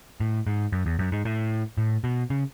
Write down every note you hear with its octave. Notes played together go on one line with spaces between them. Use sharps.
A2
G#2
F#2
E2
F#2
G#2
A2
A2
B2
C#3